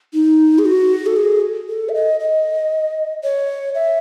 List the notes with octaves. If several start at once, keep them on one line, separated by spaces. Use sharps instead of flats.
D#4
G#4
F#4
A4
G#4
A4
E5
D#5
D#5
C#5
E5